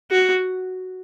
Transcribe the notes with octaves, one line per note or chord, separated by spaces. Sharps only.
F#4